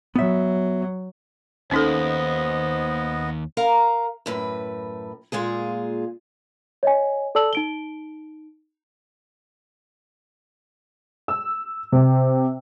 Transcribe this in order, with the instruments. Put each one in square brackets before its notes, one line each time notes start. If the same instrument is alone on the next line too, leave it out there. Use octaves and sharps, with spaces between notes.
[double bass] F#3 [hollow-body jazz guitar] B3 E5
[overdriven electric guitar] D#2 [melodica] B3 D#5 [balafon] C#4 D#4 A4 [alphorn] C5
[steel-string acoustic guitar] A#4 F5 A#5
F#2 A2 B4
A#2 G#3 F4 G#4
[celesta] C#5 D#5 G#5
A4 D5 A5 E6 F#7
D#4 D7 G7
[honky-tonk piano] E6
C3